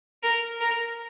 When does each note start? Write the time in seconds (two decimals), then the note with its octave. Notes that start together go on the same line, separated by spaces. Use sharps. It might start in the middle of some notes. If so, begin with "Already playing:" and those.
0.23 A#4
0.60 A#4